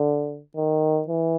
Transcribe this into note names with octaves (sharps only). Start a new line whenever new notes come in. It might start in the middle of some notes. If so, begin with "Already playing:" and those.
Already playing: D3
D#3
E3